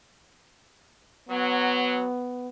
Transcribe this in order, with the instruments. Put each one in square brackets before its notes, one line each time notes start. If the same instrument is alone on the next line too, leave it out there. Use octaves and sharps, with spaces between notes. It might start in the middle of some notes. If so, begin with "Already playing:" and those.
[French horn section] F#3 [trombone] B3